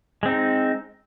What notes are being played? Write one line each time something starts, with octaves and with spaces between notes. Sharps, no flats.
G#3 C4 D#4